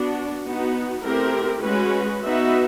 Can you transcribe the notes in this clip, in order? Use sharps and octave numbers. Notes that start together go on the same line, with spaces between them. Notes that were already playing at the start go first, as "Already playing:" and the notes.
Already playing: B3 D4 F#4
B3 D#4 F#4
A3 C4 E4 G4 A#4
G#3 C#4 F#4 B4
B3 D#4 F#4 B4 E5